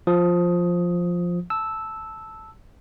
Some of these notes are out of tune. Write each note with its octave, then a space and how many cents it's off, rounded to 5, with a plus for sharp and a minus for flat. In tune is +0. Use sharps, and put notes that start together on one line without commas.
F3 +5 D#6 +10
A5 +0 E6 -5